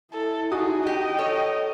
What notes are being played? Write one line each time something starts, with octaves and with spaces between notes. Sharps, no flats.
E4 A4
D#4 F#4 G#4 D#6
G4 D#5 G5
A4 C#5